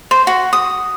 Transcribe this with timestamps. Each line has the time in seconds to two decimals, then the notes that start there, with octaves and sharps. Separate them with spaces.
0.11 C5
0.27 F#4
0.53 D#6